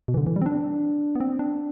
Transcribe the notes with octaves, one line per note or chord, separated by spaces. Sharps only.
B2
E3
D3
E3
G3
C4
D4
B3
C4
D4